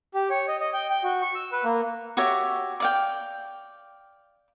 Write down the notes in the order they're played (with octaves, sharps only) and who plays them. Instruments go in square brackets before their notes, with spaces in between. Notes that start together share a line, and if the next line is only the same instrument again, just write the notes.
[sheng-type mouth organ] G4
C#5
D#5
D#5
G5
G5
F#4
C#6
E6
B4
A#3
[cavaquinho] F#4 G4 C#5 E5
D5 F5 G5